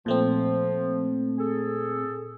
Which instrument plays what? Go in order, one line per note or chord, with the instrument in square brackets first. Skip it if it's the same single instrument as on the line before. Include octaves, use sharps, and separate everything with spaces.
[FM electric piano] A#2 A3 C4 [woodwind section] F3
[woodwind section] G#4 A4